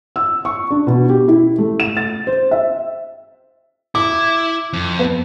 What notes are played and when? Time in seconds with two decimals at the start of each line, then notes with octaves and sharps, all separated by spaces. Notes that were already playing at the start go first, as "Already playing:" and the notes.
0.16 E6
0.45 C#6
0.70 D4
0.87 B2
1.09 G4
1.28 E4
1.58 A3
1.80 E7
1.97 A6
2.27 C5
2.51 E5
3.95 E4 D6
4.73 F2
4.99 B3